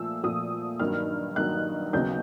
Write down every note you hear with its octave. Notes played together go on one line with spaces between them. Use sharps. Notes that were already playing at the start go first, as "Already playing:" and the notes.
Already playing: A#2 F3 A3 E6
A#2 F3 A3 D#6
G2 D#3 F#3 A#3 D#4 F6
G2 D#3 F#3 A#3 D#4 F#6
D#2 C#3 F#3 B3 D#4 G6